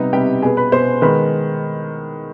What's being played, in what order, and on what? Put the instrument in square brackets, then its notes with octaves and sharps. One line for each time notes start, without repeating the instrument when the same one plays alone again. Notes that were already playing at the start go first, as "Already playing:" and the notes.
Already playing: [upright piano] C3 G3 B3 D#4 D#5
C3 G3 B3 G4 G5
B2 B3 G#4 G#5
B4 B5
B2 B3 C5 C6
D#3 G#3 B3 B4 B5